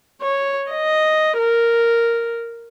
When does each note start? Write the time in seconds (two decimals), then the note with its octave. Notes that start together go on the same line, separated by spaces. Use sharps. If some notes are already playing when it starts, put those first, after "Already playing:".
0.21 C#5
0.71 D#5
1.38 A#4